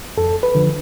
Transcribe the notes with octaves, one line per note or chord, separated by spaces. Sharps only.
F2 A4
B4
D3 F3